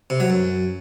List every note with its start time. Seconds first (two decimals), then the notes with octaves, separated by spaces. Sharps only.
0.10 C3
0.20 F#3
0.30 F#2